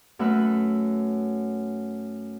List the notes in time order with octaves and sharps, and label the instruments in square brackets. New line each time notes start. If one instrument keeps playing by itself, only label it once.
[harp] F#2 A3 B4 E5 B5 F#6